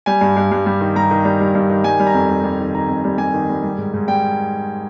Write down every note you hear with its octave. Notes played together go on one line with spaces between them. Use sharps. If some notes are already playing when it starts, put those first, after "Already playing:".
G3 G#5
G2
G2
G2
G3
D#3
G2 A#5
D#3
G3
G2
G2
D#3
G3 G#5
G3
A#5
F2
G3
G3
D#3
D#3 A#5
F2
G3
G3 G#5
D#3
G3
G3
G#2
G#2
G3 G5